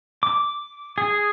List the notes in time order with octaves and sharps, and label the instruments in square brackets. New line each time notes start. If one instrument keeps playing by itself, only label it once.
[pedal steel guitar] D6
G#4